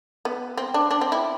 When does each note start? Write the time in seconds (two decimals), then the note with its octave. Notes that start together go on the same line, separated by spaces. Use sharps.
0.25 B3
0.57 C4
0.74 D4
0.91 D4
1.01 C4
1.12 E4